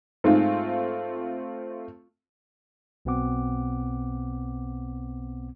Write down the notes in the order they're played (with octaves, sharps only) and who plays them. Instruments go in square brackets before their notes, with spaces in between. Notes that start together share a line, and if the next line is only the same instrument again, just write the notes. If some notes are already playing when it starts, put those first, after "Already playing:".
[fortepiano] G#2 [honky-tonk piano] A3 C4 F4
[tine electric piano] B1 B2 B3 C4 F#5 D6